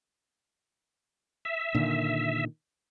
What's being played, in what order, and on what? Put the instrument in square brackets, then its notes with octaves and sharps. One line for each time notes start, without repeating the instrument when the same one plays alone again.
[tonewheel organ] E5
[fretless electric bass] A#2 D3 D#3